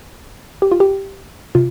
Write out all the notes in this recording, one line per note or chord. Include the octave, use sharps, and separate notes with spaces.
G4
F4
G4
C3 F4